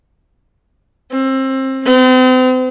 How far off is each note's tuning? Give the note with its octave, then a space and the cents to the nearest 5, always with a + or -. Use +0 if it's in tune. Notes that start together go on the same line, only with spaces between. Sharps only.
C4 +25
C4 -40